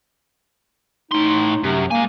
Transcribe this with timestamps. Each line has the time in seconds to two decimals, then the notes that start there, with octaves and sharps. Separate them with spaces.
1.11 A2 D#4 C6
1.64 F#2 C3
1.91 G#2 A#3 G#5